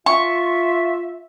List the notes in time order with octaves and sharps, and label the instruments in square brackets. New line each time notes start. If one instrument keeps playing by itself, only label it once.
[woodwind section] F4 E5 [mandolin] C#6